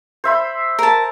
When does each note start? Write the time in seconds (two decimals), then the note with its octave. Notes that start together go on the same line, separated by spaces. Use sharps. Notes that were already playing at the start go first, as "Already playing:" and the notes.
0.24 C5 E5 B5
0.79 A#4 A5